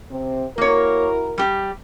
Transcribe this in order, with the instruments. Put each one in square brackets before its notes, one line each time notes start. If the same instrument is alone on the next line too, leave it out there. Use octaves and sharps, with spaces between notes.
[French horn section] C3 C4
[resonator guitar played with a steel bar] A#3 C#5 [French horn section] E4 F#4 A#4
[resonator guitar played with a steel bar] G3 G4